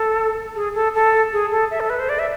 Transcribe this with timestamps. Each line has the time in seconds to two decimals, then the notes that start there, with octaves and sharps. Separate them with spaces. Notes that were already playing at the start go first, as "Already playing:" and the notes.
Already playing: A4
0.55 G#4
0.75 A4
0.94 A4
1.33 G#4
1.51 A4
1.71 E5
1.80 A4
1.90 B4
2.00 C5
2.09 D5
2.19 E5